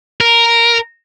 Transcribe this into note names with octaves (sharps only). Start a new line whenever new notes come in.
A#4